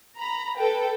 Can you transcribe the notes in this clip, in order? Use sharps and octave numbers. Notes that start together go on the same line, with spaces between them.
A#5 B5
A4 B4 G5